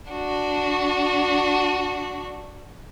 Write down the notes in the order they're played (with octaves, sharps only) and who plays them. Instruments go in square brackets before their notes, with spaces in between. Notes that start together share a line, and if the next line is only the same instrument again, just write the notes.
[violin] D4 F#4